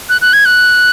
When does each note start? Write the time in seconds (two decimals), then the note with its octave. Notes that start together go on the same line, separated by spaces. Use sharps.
0.09 F#6
0.21 F#6
0.33 G#6
0.45 F#6